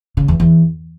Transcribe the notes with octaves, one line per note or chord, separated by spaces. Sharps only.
C#3
E2
E2